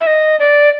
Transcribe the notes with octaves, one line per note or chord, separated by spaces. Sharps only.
E5
D#5
D5